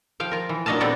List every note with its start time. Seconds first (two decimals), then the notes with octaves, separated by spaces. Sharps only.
0.20 F3 F5 G5
0.31 F4 A#4
0.49 E3
0.66 A#2 F#3 D4 D#5 F5 A5
0.80 G3 B3 C4 D4 A4